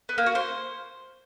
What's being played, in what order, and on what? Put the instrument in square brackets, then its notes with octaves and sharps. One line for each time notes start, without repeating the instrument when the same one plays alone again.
[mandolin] B3
A#3
F#4
C5